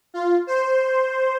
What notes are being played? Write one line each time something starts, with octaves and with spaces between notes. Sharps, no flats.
F4
C5